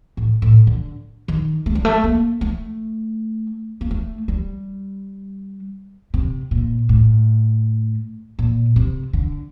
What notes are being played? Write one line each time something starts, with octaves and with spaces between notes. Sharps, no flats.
A2
A2
D3
D#3
A3
G3
A3
A#3
A3
A#3
A3
G3
C3
A#2
A2
A#2
C3
D3